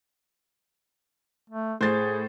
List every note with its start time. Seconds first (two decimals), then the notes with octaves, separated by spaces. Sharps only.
1.50 A3
1.81 A2 G#4 C5 A6